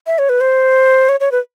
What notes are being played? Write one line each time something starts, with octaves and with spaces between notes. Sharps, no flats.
E5
C#5
B4
C5
C#5
C#5
B4